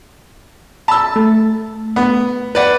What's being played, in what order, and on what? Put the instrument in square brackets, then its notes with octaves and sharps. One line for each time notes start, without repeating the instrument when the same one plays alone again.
[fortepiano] A5 E6 [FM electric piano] B5
[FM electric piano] A3
[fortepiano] B3
B4 D5 F#5